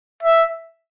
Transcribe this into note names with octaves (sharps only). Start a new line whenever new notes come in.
E5